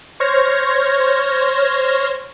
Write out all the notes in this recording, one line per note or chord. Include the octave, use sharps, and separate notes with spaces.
C5 C#5 F6 G#6 A#6